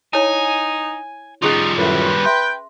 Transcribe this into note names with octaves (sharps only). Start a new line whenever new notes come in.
D#4 E4 C#5 G#5
G3 C#4 D#4 F4 G#4 C#6
F#2 A2 B4
E5 G5 C6